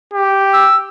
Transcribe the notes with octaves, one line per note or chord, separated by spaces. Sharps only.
G4
E6